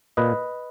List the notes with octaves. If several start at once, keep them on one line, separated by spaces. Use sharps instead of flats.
A#2 B4 D#5